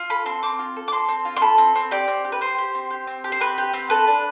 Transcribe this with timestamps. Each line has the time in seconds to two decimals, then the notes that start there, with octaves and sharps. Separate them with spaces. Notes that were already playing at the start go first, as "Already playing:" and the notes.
Already playing: F4
0.10 A4 B5
0.26 C4 C6
0.43 C4 D6
0.59 F4
0.76 A4
0.88 D6
0.92 C4 C6
1.09 C4
1.25 F4
1.37 C6
1.41 A4 B5
1.58 C4
1.75 C4
1.91 G4 D5
2.08 C4
2.25 G4
2.32 B4
2.41 C4 C5
2.58 G4
2.75 C4
2.90 G4
3.07 C4
3.24 G4
3.32 C5
3.40 C4 B4
3.58 G4
3.73 C4
3.90 A4 B4
4.07 D4